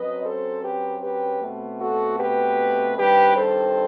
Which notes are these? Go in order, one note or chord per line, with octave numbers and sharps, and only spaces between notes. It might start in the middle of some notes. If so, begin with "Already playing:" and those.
Already playing: F#2 F#3 C4 B4 D#5
A4 C5
G4 B4
G4 B4
B2 A3 C4
F#4 A4
G4 B4
G2 D#3 G3 C4 G4 B4
A4 C5